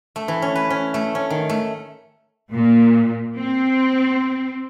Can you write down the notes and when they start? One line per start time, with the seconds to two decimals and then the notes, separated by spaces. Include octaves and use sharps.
0.16 A3
0.28 E3
0.42 C#4
0.55 B4
0.70 C#4
0.94 A3
1.15 C#4
1.30 D#3
1.49 A3
2.52 A#2
3.37 C4